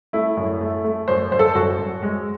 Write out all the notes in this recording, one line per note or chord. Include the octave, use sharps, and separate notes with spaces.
A3 E4
F#2
A3
A3
F#2 C5
F#2 C5
A4
F#2 F#4
F#2
G#3